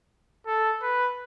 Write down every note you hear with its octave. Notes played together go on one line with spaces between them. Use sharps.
A4
B4